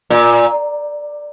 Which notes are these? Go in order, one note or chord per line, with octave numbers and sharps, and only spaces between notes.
A#2